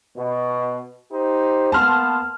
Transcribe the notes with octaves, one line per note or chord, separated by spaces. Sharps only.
B2
D#4 G4 C5
A#3 B3 A5 C6 F6